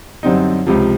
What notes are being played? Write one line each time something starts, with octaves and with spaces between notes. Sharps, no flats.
F#2 D3 G3 C4 D#4
C#2 C3 F3